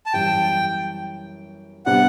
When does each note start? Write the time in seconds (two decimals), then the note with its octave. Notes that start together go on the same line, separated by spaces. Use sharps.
0.06 A5
0.13 F#2 E3 G3 G5
1.86 C3 G3 B3 D4 F#5